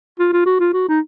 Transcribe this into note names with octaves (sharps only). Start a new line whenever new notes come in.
F4
F4
F#4
F4
F#4
D#4